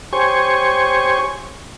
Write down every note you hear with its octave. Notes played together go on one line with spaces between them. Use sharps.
G4 C5 C#5 G#5 C#6